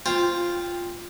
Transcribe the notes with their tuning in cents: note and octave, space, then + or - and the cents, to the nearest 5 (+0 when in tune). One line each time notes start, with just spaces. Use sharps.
F4 +0 C5 +0 G5 +20